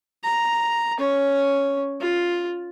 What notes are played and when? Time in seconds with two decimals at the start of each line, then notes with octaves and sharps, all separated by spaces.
0.23 A#5
0.99 C#4 C#5
2.01 F4